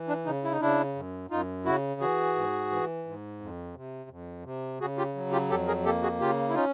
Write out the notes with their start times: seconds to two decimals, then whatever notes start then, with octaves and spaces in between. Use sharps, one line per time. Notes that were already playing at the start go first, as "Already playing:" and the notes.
Already playing: E3
0.08 D4
0.25 C#3 D#4
0.44 E4
0.52 D#4
0.61 C#3 D4 E4
0.95 F#2
1.30 F#2 D#4 F4
1.65 C#3 E4 F#4
2.00 E3 F#4 G#4
2.36 G#2
2.71 E3
3.06 G#2
3.41 F2
3.75 C3
4.10 F2
4.45 C3
4.81 C#3 F#4 G#4
4.98 F4 G4
5.15 F#3
5.32 F4 G4
5.50 F2 G4 A4
5.67 G#4 A#4
5.85 A#3 G4 A4
6.03 F#4 G#4
6.20 C#3 F4 G4
6.49 E4
6.54 C#4 D#4 F4